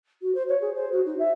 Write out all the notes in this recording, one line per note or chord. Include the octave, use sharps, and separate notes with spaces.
F#4
C5
C#5
G#4
C5
F#4
D#4
E5